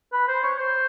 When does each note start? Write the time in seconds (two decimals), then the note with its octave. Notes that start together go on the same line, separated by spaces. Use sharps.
0.13 B4
0.28 C5
0.43 C#5
0.58 C5